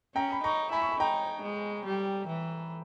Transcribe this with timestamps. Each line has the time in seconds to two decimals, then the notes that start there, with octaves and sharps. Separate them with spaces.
0.15 C#4 G5 A#5
0.32 B5
0.44 D#4 A#5 C#6
0.72 E4 G#5 B5
0.82 C#6
0.92 B5
1.00 D#4 G5 A#5
1.42 G#3
1.86 G3
2.28 E3